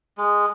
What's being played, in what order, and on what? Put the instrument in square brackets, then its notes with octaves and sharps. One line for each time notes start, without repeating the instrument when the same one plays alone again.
[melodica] G#3